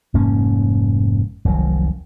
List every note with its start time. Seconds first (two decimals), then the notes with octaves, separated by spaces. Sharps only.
0.14 F1 G#2 A#3 C#4
1.45 F1 C2 D#3 F#3